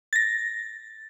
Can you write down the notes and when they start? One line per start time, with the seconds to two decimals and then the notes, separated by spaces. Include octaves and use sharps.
0.13 A6 A#6